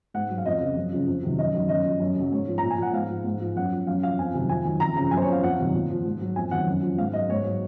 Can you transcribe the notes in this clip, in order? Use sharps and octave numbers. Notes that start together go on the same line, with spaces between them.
G#2 F#5
F#3
F5
F2 D#5
C#3 F3
F#2
C#3 F3
F2
C3 D#3 F#3
F#2 D#5
D#3 F#3
F#2 D#5
F3
F#2
C#3 F#3
G#2 C#5
F3
A#5
A#2
G#5
F3 F#5
G#2 F5
F3
G#2
F3
F#2 F#5
F3
F#2 F5
F3 F5
F2 G#5
C3 D#3 F#3
F2 G#5
D#3 F#3
F2 A#5
C#3 F3 A#5
F#2 G#5
C5
C#5
F3
F5
F2 F#5
C3 D#3 F#3
A#2
F3
G#2
F#3
F2 G#5
D#3 F#3 F#5
F#2
F3
G#2 F5
F#3 D#5
G#2 C#5
F#3